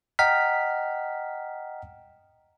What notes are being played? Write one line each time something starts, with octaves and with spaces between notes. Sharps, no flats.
D#5 F#5 G5 A#5 F6 B6